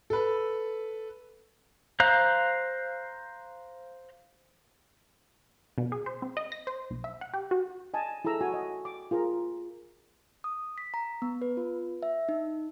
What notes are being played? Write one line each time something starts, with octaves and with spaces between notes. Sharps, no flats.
A4 B4
C5 F5 A#5 F#6
B2
G#4
C5
C4
D#5
A#6
C5
B1
E5
F#5
G4
F#4
D#5 G#5 A5
E4 G#4 A4 A#5 E6
F#4 G#5
D#5
D6
F4 G#4 A#4 A#5
D#6
B6
A#5
B3
B4
F4
E5
D#4